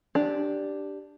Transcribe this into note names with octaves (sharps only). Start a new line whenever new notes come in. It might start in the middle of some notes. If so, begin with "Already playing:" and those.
D4 G4